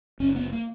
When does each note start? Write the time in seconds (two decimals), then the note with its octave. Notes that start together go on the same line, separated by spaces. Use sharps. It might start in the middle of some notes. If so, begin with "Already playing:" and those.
0.20 F#1 C#4
0.36 B3
0.53 A#3